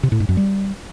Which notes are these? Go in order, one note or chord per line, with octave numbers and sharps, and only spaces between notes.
C3
A2
G#2
F#2
G3